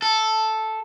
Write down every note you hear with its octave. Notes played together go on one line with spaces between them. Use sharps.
A4